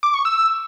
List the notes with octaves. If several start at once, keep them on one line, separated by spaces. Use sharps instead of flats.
D6
C#6
E6